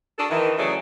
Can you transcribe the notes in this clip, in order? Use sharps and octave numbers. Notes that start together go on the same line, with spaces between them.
D4 F#4 G#4 A4
D#3 E3
C#3 F#3 A3 G#4 D5